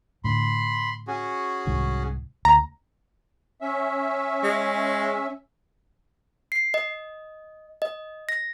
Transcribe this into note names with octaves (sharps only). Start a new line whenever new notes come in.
A2 D3 B5 C6
C#4 F#4 G#4
C2 G#2 D#3
D2 A#5
C#4 E5
G#3
C7
D#5
D#5
A#6